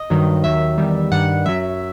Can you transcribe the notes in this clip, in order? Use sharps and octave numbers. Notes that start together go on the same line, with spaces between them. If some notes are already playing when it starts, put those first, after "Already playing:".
Already playing: D#5
G2 D#3 F#3
D#2 D#3 F#3 E5
E2 D#3 G3
G2 D#3 G3 F#5
F#2 F#3 E5